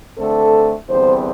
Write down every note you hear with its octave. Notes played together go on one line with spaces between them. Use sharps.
D3 A3 C4 A4
E2 D3 G3 C4 C5